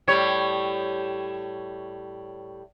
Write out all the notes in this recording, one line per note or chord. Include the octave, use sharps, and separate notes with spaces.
A2 G3 C#5